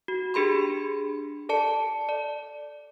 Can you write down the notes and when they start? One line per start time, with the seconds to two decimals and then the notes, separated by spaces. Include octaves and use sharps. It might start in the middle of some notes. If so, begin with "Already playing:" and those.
0.08 F#4
0.34 D4 G4 G#4 B5 C6
1.49 A4 D5 A5 C#7
2.09 D5